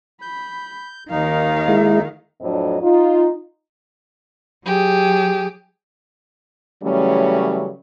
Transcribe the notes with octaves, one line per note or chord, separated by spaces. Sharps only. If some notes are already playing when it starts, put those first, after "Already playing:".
B5 G6
D#2 D#3 D#4 A#4 F5
G#3 E4
F2 A2 F#3 C4 D4 D#5
D#4 F4
F#3 G4 G#4
C#3 E3 F#3 G3 A3 C#4